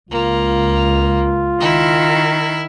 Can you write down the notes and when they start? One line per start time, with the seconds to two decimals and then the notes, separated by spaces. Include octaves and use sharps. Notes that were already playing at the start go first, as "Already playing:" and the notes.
0.11 C#2 A#3 F4
1.60 D#3 E4